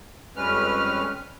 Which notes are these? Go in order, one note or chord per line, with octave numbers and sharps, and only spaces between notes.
F2 G3 G#3 C#4 B4 F6